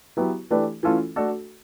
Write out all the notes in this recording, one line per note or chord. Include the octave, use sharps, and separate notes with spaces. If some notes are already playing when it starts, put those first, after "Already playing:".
F#3 B3 E4 G4 B4
E3 A3 D4 G4 B4
E3 A3 C#4 F4 A4
A3 D4 F#4 A4